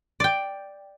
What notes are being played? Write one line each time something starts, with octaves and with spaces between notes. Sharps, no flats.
D5 G5